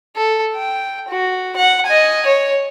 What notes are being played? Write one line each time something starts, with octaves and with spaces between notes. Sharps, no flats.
A4
G5
F#4
F#5
D#5 G#5
C#5